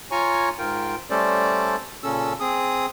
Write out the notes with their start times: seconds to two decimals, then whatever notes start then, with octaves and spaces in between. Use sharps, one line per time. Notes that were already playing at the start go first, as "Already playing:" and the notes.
0.11 F4 C#5 G#5 A#5 C#6
0.59 G#2 F4 A#4 G5
1.10 G3 A3 C#4 A4 C5 D5
2.03 A#2 C#3 C#4 A4 E6
2.40 C4 G#4 D#6